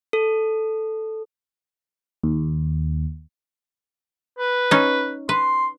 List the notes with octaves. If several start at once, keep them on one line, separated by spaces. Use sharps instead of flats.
A4
D#2
B4
C#4 D#4
B4 C6